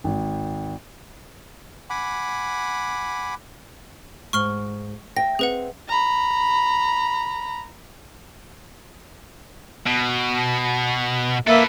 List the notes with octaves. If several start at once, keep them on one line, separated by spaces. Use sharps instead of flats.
G#1
F#5 G#5 B5 D6
G#2 C#6 F6 G7
E5 G5 A#6
C4 G#4 B4 F#5
A#5 B5
B2
A#3 A4 B4 E5